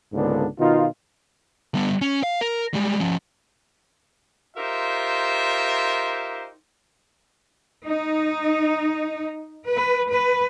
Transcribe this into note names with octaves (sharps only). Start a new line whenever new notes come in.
C#2 G#2 D3 A#3 B3 D4
B2 D#3 D#4 F4
G3 B3
C#4
F5
A#4
G3 G#3
F3 C#4
D#4 F4 G4 A#4 C5 E5
D#4
B4
B4